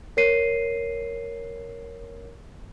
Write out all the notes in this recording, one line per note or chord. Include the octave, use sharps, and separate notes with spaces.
A#4 C#5 C7 D#7